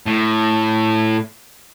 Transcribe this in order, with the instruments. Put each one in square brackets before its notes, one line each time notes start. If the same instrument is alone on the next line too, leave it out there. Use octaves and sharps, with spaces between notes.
[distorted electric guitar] A2